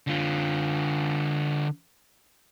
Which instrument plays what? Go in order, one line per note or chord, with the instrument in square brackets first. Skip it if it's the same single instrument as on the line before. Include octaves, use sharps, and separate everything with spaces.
[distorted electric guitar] D3 F4